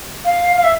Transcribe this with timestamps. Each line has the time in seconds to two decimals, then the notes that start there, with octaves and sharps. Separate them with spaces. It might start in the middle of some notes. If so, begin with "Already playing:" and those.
0.24 F5
0.56 F5
0.63 E5